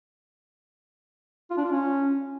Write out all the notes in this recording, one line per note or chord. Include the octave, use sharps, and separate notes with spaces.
F4
D4
F4
C#4